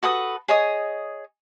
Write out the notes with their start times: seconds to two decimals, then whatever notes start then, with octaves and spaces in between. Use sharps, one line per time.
0.03 F#4 A4 B4 D#6
0.48 G#4 C#5 D#5 D#6